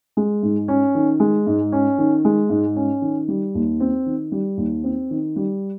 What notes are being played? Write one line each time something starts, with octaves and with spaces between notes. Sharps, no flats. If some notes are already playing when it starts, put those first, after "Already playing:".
G#3
G#2
C#4
D#3
G#3
G#2
C#4
D#3
G#3
G#2
C#4
D#3
G3
D#2
C4
D#3
G3
D#2
C4
D#3
G3